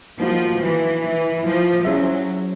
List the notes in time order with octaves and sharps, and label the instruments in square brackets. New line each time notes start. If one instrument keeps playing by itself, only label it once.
[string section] F3 [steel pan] A#3 D#4 F#4
[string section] E3
E3
F3
[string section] F#3 [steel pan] C#4 E4 G#4 C5 E5